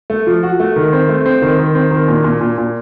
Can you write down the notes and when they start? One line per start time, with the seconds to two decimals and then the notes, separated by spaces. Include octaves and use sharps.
0.10 A3
0.27 F3
0.43 F#4
0.60 A3
0.76 D#3
0.93 C4
1.09 A3
1.26 C4
1.42 D#3
1.59 D#3
1.75 C4
1.91 D#3
2.08 A#2
2.24 A#2
2.41 A#2
2.58 A#2